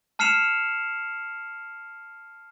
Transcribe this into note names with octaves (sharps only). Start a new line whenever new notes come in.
A5 F6 C7 C#7 E7 F7